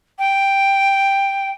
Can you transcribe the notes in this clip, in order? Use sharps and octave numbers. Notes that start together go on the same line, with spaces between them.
G5